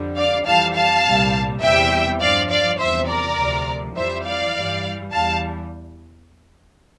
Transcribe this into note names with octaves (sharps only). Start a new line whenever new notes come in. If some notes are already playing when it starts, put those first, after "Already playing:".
Already playing: F2 D3 G3
D5 F5
F2 E3 G3 F5 A5
F5 A5
C2 A#2 G3
E2 C3 E3 G3 E5 G5
G2 F3 D5 F5
D5 F5
E2 C3 F3 C5 E5
A#4 D5
D2 C3 F3
F2 E3 G3 C5 E5
D5 F5
G2 E3 G3
E2 E3 G3 F5 A5